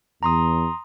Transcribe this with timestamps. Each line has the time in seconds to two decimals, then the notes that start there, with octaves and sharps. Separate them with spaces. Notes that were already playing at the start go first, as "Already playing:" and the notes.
0.23 E2 A#5 C6 D#6